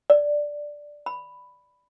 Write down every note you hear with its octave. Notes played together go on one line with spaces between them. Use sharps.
D5
B5